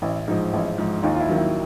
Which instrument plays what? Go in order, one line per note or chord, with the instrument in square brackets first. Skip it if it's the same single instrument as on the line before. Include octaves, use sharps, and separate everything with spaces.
[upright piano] A1 E4
G#2 F3 D#4
A1 E4
G#2 F3
D#2 D#4 F4
F4
E4
D#3 F#3
E4